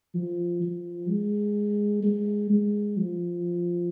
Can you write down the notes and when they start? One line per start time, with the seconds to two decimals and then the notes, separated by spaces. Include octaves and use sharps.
0.14 F3
0.62 F3
1.09 G#3
2.03 G#3
2.50 G#3
2.97 F3